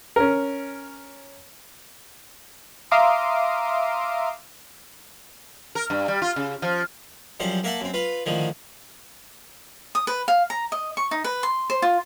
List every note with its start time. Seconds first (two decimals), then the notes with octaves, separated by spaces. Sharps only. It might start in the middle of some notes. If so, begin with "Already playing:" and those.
0.16 C#4 A#4
2.91 E5 F5 A#5 C6 D6 D#6
5.75 A#4
5.90 G2
6.08 G3
6.22 F4
6.36 C#3
6.62 F3
7.40 F#2 F3 G3 C5
7.64 A#3 A#4 E5 F#5 A5
7.81 F#2 C4
7.94 F4 B4
8.26 A2 D3 D#3 F3
9.95 D#6
10.07 B4
10.28 F5
10.50 A#5
10.72 D#5
10.97 C#6
11.11 D#4
11.24 B4
11.43 C6
11.70 C5
11.82 F4